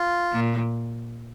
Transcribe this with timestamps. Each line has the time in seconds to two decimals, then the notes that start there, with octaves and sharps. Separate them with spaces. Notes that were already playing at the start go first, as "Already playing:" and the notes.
Already playing: F4
0.32 A#2